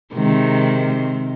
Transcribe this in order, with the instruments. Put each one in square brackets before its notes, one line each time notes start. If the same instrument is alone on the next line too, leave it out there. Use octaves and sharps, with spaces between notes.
[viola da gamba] C3 D#3 G#3